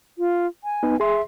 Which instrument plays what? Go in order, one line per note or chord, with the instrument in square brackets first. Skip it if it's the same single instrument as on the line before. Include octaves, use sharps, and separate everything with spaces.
[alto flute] F4
G#5
[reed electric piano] B3 D#4 B4
[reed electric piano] G#4 C6 [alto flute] E5